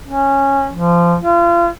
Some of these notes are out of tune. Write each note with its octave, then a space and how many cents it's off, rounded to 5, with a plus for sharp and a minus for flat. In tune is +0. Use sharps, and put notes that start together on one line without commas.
C#4 -15
F3 -20
F4 -35